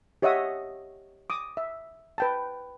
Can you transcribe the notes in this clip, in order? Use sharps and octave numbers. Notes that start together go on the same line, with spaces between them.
G4 C#5 D#5 E5 F#5 D#6
D6 D#6
E5
B4 G5 A5